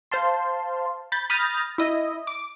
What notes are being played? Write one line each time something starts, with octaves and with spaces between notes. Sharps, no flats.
C5 F5 A5 C6
B5 G6 A6
B5 D#6 F6 G6 A6 A#6
E4 D#5 E5
D6